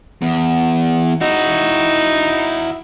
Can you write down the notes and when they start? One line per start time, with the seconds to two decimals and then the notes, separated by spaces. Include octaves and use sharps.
0.22 E2
1.21 D#4 E4 F#4